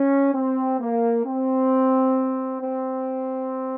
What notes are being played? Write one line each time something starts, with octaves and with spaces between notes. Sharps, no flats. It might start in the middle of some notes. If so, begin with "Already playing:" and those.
Already playing: C#4
C4
A#3
C4
C4